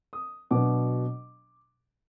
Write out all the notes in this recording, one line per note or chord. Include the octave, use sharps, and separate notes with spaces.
D#6
B2 F#3 B3 D4 D6